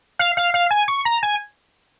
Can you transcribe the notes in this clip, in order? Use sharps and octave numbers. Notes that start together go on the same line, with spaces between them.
F5
F5
F5
G#5
C#6
A#5
G#5